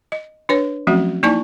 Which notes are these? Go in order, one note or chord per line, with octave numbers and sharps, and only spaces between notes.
D#5
D4 B4 C#5
F3 F#3 A3 C4 C#4 F#4
A#3 D#4 E4 D5 A5 C#6